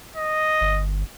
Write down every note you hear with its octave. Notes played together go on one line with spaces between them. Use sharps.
D#5
G1